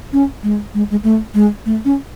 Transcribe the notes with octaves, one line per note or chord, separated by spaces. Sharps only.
C#4
G#3
G#3
G#3
A3
G#3
A3
C#4